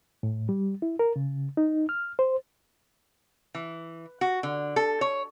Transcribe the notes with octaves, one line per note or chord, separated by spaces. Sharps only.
A2
G3
E4
A#4
C#3
D#4
F6
C5
E3
F#4
D3
A4
C#5